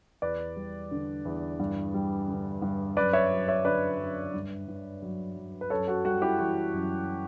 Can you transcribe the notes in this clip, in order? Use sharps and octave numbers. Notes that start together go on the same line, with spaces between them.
E2 B4 D5
G3
D3
E2
G2
G3
D3
G2
F#2 B4 D5
C#5 E5
F#3
C#5 E5
D3 B4 D5
F#2
G2
G2
F#3
F#3
B4
F#2 A4 C#5
F#4 A4
G3 F#4 A4
E4 G4
E3 F#4
F#2